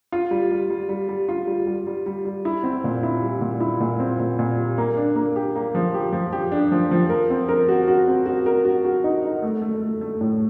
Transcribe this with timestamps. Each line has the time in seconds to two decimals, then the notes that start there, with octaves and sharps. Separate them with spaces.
0.12 F4
0.31 G3
0.51 G3
0.70 G3
0.89 G3
1.09 G3
1.29 F4
1.47 G3
1.66 G3
1.87 G3
2.06 G3
2.25 G3
2.45 E4
2.63 C4
2.84 A#2
3.03 E4
3.22 G3
3.41 A#2
3.60 E4
3.80 A#2
4.00 C4
4.20 A#2
4.39 A#2
4.58 G3
4.78 A#3
4.97 D4
5.16 A#3
5.36 G4
5.56 A#3
5.75 F3
5.94 G4
6.13 F3
6.32 G4
6.52 D4
6.72 F3
6.91 F3
7.10 A#4
7.30 C4
7.49 A#4
7.69 F#4
7.88 F#4
8.08 C4
8.26 F#4
8.46 A#4
8.65 F#4
8.85 F#4
9.04 D#4
9.24 D#4
9.42 A3
9.62 A3
9.81 A3
10.01 A3
10.21 A2